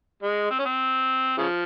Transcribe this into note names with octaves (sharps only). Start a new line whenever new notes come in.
G#3
C4
C#4
C4
C#3 F3